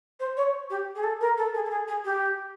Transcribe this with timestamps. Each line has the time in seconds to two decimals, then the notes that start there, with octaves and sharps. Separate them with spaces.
0.20 C5
0.37 C#5
0.70 G4
0.96 G#4
1.03 A4
1.21 A#4
1.37 A4
1.54 G#4
1.65 A4
1.71 G#4
1.88 G#4
2.05 G4